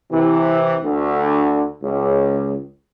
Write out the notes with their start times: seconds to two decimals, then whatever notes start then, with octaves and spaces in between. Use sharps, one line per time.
0.12 C3 E3
0.83 D2 D3
1.83 C#2